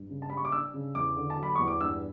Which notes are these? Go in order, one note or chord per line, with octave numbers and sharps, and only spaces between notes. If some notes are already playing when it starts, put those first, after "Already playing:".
Already playing: G2
C#3
A5
G3 B5
C#6
D6
D4 E6
C#3
E2 D6
D3
A5
F#3
B5
E2 C#6
D6
G2 E6